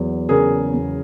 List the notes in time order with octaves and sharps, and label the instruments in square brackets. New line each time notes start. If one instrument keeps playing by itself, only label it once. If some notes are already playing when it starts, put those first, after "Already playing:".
Already playing: [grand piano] E2 F#3
[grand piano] C#3 [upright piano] G#4 A#4
[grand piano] E2